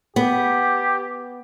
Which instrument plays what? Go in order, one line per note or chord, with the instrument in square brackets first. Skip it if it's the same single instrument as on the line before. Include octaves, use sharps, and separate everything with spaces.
[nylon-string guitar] B3 [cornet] G4